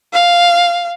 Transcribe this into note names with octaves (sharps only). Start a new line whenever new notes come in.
F5